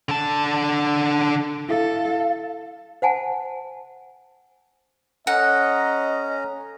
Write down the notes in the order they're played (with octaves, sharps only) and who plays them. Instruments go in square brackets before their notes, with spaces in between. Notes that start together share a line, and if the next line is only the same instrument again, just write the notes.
[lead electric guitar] D3 A5
[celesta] E4 E5 [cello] A4 [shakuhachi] F5
[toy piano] C5 F#5 G#5 A5
[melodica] C#4 A#5 [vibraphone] A4 C#5 [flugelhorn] D#5 [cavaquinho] F#5